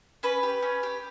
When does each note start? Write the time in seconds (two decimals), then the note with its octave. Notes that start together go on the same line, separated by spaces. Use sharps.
0.23 C#4 B4
0.43 G4
0.62 C#4
0.83 G4